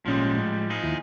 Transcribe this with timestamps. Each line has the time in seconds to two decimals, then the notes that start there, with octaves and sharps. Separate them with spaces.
0.05 G#1 A#2 F3 G3 G#3 C#4
0.37 A2
0.70 F3 D#4 G#4
0.84 D#2 E4